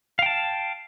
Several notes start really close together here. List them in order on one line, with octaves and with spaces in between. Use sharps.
F5 G5 A5